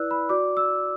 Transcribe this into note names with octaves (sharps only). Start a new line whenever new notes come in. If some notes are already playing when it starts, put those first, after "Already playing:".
Already playing: E4 B4 D5 E6 F#6
B5
F#4 D5 D6
E6